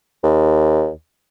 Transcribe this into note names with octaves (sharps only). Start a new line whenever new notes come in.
D#2